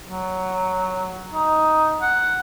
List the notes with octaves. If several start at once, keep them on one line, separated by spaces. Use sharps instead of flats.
F#3
D#4
F#5